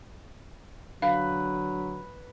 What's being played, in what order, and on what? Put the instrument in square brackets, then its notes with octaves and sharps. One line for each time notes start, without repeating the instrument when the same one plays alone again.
[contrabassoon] D3 [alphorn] F#3 [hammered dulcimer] B4 [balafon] F5